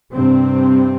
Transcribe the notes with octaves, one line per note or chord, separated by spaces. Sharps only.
G2 C3 C4